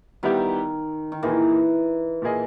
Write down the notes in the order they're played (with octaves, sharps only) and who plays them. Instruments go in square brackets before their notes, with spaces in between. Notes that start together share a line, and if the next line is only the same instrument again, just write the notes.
[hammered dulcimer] D#3 [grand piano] G3 B3 E4 G4
[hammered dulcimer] D#3
[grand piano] A#2 A#3 D#4 G#4 B4 [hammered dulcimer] E3
[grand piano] A#2 A#3 E4 G#4 D#5